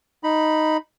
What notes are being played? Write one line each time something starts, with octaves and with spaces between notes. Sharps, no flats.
D#4 B5